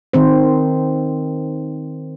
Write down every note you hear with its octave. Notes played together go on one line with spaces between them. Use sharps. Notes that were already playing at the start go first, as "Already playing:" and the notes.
D#3 C4 C5